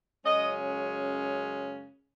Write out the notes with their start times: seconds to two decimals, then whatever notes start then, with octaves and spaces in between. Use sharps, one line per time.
0.25 F#2 C#3 G#3 C#4 D#5